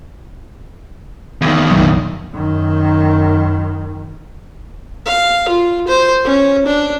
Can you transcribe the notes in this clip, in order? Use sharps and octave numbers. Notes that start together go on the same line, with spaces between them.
E2 D#3
F1 A#1 F#3
F#2 D#3
F5
F4
C5
C#4
D4